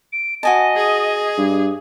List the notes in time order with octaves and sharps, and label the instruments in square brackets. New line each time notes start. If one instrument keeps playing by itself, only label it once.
[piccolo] D7
[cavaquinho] F#4 G#5 A5 [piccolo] D#5
[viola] G#4
[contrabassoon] G2